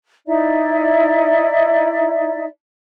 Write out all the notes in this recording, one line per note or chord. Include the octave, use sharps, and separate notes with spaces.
D#4 E4 D5 E5